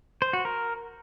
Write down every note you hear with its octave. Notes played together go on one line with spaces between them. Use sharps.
C5
F#4
A#4